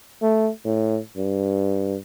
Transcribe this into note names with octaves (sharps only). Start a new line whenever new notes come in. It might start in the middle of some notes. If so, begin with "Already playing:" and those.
A3
A2
G2